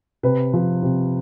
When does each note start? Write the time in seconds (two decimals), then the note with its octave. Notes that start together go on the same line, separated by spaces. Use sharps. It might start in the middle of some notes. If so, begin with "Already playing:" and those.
0.23 C3 B4
0.53 F3
0.83 C3